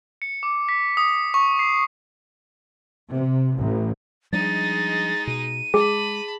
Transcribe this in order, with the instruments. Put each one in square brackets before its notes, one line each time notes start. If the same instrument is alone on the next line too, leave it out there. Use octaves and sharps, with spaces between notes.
[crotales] C#7
D6
B6
D#6
C#6
C7
[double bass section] C3
A1
[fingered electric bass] F3 G3 D4 [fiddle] G#3 D#4 [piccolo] A6
[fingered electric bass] B2 [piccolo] D#7
[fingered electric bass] G#3 [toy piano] G#4 [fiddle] A5 B5